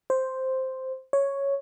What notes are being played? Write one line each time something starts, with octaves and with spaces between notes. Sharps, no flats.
C5
C#5